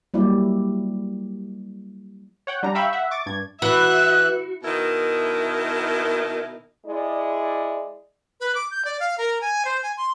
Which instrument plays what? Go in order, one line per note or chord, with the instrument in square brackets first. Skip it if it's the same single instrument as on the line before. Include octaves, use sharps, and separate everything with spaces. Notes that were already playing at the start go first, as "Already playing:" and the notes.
[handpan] F#3 G3 A#3 E4 D5
[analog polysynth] C#5 F#5 G5
G3 D4 A#5
E5 F5 G5 B5 C#6 E6
E5 F#5
C#6 D6 A6
G2 G#6
[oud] E3 [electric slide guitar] F#4 [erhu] E5 [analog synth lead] F#6
[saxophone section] B2 D#3 E4 A#4
[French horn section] G#3 E4 D5
[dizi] B4
D6
G6
D5
F5
A#4
G#5
C5
G#5
C6